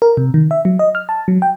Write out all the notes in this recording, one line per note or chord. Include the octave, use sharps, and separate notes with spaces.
A#4
C3
D#3
E5
F#3
D#5
F6
A5
F#3
G5